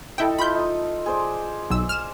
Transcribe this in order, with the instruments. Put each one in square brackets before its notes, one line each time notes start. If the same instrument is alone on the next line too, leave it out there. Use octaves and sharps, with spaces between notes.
[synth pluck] E4 G5 [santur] A4 D#5 E5
[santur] E4 F4 [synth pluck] B5 G6
[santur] D#4 D#6
G#4 C5 D5
[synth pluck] B1 E6
F6 E7